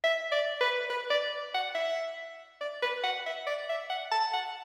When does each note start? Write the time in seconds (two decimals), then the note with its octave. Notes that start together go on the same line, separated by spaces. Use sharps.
0.04 E5
0.32 D5
0.61 B4
0.90 B4
1.10 D5
1.54 F#5
1.75 E5
2.61 D5
2.82 B4
3.04 F#5
3.26 E5
3.47 D5
3.69 E5
3.90 F#5
4.11 A5
4.33 F#5